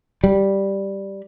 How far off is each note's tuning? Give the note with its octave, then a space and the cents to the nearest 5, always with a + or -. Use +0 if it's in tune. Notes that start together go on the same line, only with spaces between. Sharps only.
G3 +0